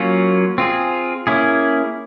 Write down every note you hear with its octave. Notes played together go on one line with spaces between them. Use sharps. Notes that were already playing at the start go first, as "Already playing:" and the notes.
Already playing: F#3 A#3 C#4 F4
C4 F4 G#4
A#3 C#4 E4 G#4